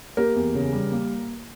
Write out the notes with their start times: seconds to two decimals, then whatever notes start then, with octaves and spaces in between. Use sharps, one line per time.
0.17 A#3 G4 A#4
0.36 E2
0.55 C#3
0.73 G3
0.92 A#3